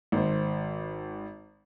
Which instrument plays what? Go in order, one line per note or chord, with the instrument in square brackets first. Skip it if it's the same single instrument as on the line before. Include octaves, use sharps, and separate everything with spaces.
[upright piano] G#1 C5